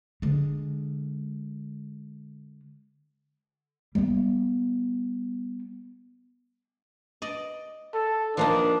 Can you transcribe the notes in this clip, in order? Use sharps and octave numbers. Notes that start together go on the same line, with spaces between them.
D3 G#3
G3 B3
D5 D#5
A4
F3 A#3 D4 D#4